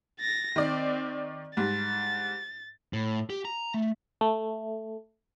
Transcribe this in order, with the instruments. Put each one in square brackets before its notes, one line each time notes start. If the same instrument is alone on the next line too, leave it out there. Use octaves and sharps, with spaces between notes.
[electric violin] A6 A#6
[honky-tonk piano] D#3 D5 [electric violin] C4
[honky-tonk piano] G#2 G3 [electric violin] A6
[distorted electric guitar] A2
G4
A#5
A3
[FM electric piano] A3